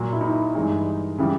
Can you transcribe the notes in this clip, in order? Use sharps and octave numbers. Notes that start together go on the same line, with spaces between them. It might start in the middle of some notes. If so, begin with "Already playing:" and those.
Already playing: A#2 F#3 F#4
E4
D#4
E4
G2 E3 G#3 D#4
C#3 E3 G3